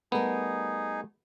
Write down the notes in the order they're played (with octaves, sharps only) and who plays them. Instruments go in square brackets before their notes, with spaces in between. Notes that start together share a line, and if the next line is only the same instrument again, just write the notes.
[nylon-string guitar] G3 A3 A#4 [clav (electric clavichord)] B3 [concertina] D#4 G#4